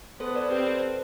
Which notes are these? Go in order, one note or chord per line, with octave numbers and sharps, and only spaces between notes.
B3 A4 C5
B4 D5
C4 G4 B4
A4 C5